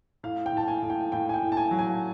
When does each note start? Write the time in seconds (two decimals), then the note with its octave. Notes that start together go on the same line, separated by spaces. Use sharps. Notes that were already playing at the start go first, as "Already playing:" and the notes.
0.23 A2 F5
0.46 G5
0.53 A2 A5
0.68 G#5
0.82 A2
0.90 G5
1.12 A2 G5
1.29 G#5
1.34 G5
1.42 A2
1.52 A5
1.57 G#5
1.71 F#3
1.79 G#5